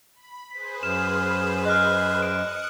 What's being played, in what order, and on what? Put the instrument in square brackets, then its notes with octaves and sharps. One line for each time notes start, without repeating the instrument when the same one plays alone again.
[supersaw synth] B5
[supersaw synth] G#4 B4 C5 [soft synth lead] B6
[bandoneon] F#2 [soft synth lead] F6 [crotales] E7
[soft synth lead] D#5 [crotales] F6 F#6
[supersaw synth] D#6 F#6 C#7 [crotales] F6 D7